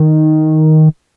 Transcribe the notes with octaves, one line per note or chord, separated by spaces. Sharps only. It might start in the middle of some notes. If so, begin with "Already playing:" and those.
Already playing: D#3